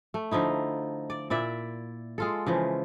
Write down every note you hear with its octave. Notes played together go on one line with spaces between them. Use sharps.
A3
D3 F3 D#4 E4
D5
A#2 E4 D5 E5
G#3 F4 A4
C#3 E3 F3